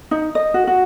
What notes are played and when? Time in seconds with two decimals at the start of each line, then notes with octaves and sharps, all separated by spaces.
0.11 D#4
0.35 D#5
0.54 F#4
0.67 F#4